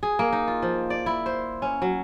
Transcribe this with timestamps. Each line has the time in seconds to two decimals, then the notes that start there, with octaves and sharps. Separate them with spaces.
0.03 G#4
0.19 A#3
0.33 D#4
0.48 F4
0.62 F3
0.90 D5
1.06 E4
1.26 C5
1.62 C#4
1.82 F#3